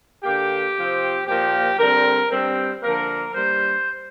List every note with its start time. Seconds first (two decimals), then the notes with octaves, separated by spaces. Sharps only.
0.23 D3 A#3 G4
0.75 C3 F3 C4
1.27 A#2 F3 A#3 G4
1.79 D3 G3 C4 A#4
2.30 G2 G3 C4
2.83 D3 F3 A#3 A#4
3.35 G2 G3 A#3 C5